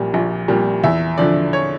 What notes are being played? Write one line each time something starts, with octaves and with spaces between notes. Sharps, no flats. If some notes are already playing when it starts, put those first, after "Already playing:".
Already playing: A#1 A#2 G3
A#1
A#2 G3
E2 E5
D3 F3 D5
C#5